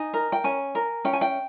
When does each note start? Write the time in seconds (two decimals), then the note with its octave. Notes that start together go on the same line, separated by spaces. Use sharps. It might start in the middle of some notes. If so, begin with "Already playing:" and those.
Already playing: D#4 G#5
0.14 A#4
0.32 G5
0.44 C#4 G#5
0.75 A#4
1.05 C#4 G5
1.13 G#5
1.21 G5